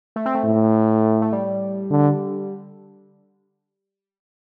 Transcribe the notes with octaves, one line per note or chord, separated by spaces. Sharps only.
A3
C4
A3
A2
A3
G3
D3